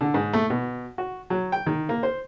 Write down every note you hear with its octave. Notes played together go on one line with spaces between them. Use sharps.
D3
G#2
A3
B2
F#4
F#3
G5
D#3
A#3
C5